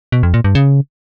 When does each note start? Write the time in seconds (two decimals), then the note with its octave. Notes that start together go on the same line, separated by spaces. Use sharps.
0.12 B2
0.23 F2
0.34 A#2
0.44 G2
0.55 C#3